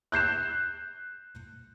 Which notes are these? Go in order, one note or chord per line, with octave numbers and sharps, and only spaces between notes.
F#6 G6 C7 E7